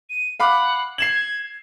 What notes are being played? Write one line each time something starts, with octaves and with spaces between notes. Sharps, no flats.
D#7
F5 F#5 B5 D6
G#6 C7 E7 F#7